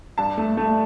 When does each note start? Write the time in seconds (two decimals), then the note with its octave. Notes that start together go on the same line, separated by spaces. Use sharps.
0.18 G2 A5
0.38 A3
0.57 A3